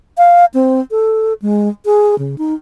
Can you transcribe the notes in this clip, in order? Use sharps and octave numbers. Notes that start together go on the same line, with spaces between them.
F5
C4
A4
G#3
G#4
C#3
D#4